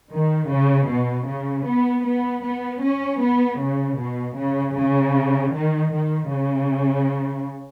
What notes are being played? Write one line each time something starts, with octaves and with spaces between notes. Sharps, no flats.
D#3
C#3
B2
C#3
B3
B3
B3
C#4
B3
C#3
B2
C#3
C#3
D#3
D#3
C#3